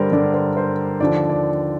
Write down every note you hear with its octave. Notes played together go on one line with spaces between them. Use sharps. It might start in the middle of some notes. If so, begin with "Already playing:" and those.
Already playing: G2 D3 G3 A#4 C5 D5
G2 D3 G3 D5
C5
C5
D#2 D3 F3 D5
D5